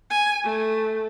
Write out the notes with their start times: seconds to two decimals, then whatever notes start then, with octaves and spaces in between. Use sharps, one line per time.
0.10 G#5
0.44 A3